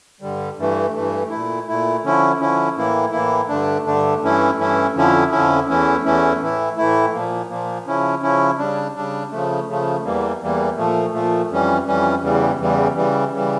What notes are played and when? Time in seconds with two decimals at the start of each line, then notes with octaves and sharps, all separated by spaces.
0.21 G2 D3 G3
0.57 G2 E3 A3
0.94 G2 E3 A3
1.30 A#2 A3 E4
1.68 A#2 A3 E4
2.03 D3 F3 C#4 E4
2.39 D3 F3 C#4 E4
2.76 A2 E3 A#3 E4
3.12 A2 E3 A#3 E4
3.49 G2 D3 A3 D4
3.85 G2 D3 A3 D4
4.21 G2 E3 A3 C#4 E4
4.58 G2 E3 A3 C#4 E4
4.94 F2 D3 F3 C#4 E4
5.31 F2 D3 F3 C#4 E4
5.67 E2 E3 A3 C#4 E4
6.04 E2 E3 A3 C#4 E4
6.40 A2 E3 A3 E4
6.77 A2 E3 A3 E4
7.13 A#2 F3 A#3
7.49 A#2 F3 A#3
7.86 C#3 F3 C#4 E4
8.22 C#3 F3 C#4 E4
8.58 C#3 G3 D4
8.95 C#3 G3 D4
9.31 C#3 F3 A3
9.67 C#3 F3 A3
10.04 E2 E3 G3 A#3
10.41 E2 E3 G3 A#3
10.76 A#2 F3 A3
11.13 A#2 F3 A3
11.50 F2 E3 G3 C#4
11.86 F2 E3 G3 C#4
12.22 E2 C#3 E3 G3
12.59 E2 C#3 E3 G3
12.95 C#3 E3 G3
13.32 C#3 E3 G3